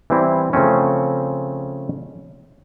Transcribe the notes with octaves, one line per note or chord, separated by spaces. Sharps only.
E3 G3 C4 E4
C#3 F3 A3 C4 C#4